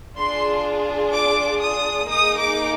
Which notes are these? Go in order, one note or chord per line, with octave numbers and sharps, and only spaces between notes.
D4 F4 G#4 C6
D6
D#6
A#3 D#4 G#4 D#6
D6